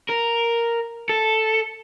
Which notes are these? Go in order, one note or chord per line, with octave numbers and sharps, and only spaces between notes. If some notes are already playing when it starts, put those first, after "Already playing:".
A#4
A4